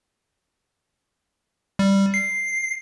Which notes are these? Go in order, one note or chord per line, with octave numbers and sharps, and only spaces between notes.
G3
C7